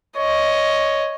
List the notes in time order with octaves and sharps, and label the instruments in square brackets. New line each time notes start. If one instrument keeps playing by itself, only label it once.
[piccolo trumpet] C#5 [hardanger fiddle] D#5